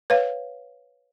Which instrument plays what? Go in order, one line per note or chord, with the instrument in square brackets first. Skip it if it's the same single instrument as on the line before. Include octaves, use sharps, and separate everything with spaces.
[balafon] B4 C#5 F5